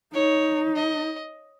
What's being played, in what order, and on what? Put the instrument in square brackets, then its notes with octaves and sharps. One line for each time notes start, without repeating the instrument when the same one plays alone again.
[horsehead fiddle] D#4 [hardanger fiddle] C#5
[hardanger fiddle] D#5